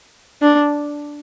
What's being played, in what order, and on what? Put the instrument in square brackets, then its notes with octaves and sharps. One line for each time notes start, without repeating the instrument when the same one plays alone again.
[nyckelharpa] D4